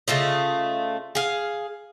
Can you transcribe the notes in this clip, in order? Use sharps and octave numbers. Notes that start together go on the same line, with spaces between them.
C#3 A3 F4 D#5
G#4 F5